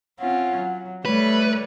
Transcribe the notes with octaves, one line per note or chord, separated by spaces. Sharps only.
C4 C#4 F4 F#5
F#3
G3 A3 B4 C#5